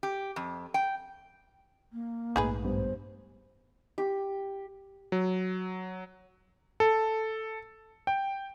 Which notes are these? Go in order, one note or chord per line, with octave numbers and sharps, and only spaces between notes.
G4
F2
G5
A#3
A#1 G#2 A3 D#4 G#4 B4
G2 B3 C5
G4
F#3
A4
G5